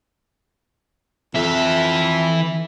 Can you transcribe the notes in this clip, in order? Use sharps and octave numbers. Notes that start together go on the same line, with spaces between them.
F2 E3 E5